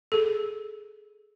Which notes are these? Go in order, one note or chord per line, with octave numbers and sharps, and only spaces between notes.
G#4 A4